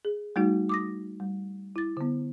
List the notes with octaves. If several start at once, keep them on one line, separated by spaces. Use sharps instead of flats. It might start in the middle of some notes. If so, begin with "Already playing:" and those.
G#4
G3 A3 D#4 F#4
D6 D#6 A#6
G3
E4 A6
D3 B3